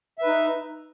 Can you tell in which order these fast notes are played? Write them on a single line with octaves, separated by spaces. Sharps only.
E5 B4 D#4